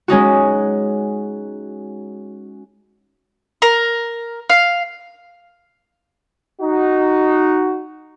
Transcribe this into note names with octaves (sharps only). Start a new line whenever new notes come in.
G#3 C#4 D#4 F#4
A#4
F5
D#4 F#4